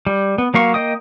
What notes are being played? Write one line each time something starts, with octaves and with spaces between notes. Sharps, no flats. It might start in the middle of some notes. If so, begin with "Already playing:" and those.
G3
B3
F#3 A#3 F5 C#6
A#3 D#5 G5 D#6